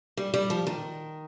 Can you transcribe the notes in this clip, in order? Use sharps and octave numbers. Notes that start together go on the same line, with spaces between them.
G3
G3
F3
D#3